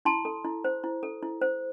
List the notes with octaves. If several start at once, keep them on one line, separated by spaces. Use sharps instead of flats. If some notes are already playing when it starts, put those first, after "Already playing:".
E4 A5 C6
A4
E4
C5
E4
A4
E4
C5